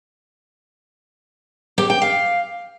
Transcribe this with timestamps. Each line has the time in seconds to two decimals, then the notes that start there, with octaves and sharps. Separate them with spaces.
1.78 G4
1.90 G5
2.02 F5